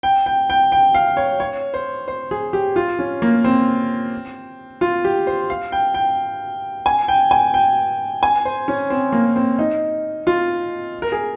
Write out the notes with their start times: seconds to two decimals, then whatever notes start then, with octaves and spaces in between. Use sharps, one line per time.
0.03 G5
0.26 G5
0.50 G5
0.72 G5
0.95 F5
1.17 C#5
1.40 C#5
1.74 C5
2.08 C5
2.31 G#4
2.53 G4
2.76 F4
2.99 C#4
3.22 A#3
3.44 C4
4.81 F4
5.04 G4
5.27 C5
5.50 F5
5.72 G5
5.94 G5
6.86 G#5
7.08 G5
7.31 G#5
7.54 G5
8.23 G#5
8.45 C5
8.68 C#4
8.90 C4
9.12 A#3
9.36 C4
9.59 D#4
10.27 F4
11.02 A#4
11.12 G#4